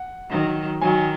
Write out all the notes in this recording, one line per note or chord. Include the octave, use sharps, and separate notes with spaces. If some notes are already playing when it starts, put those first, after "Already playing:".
Already playing: F#5
D#3 F#3
D#3 F#3 G#5